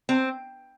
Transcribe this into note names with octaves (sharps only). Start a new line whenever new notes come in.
C4